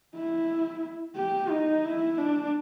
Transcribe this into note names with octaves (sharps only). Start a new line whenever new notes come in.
E4
G4
D#4
E4
D4